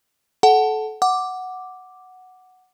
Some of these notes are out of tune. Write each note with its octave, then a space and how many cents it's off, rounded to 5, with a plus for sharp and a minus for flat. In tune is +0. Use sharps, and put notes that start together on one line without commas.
A4 -25 F#5 +5 A5 +0
F#5 +0 D6 +0